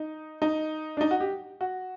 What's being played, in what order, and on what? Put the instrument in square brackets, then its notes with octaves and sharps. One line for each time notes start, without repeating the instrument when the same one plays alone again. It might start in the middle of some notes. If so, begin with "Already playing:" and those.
Already playing: [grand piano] D#4
D#4
D4
D#4
F#4
G4
F#4